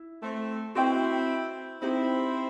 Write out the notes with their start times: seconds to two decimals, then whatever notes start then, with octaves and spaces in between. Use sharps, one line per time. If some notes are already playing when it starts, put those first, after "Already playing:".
Already playing: E4
0.22 A3 C4
0.75 C4 E4 F#4 B4 D#5 G5
1.81 C4 D#4 E4 G4 D#5